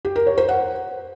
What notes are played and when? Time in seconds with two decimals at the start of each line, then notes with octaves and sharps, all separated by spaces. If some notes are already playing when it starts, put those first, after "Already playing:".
0.05 G4
0.16 A#4
0.27 C#5
0.38 C5
0.49 F#5